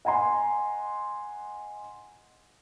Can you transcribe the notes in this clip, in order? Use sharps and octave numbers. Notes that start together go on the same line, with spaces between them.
D#5 F#5 G#5 A#5 C6